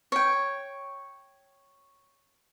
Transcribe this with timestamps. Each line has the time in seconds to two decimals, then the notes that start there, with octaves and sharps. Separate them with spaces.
0.12 C#5 G5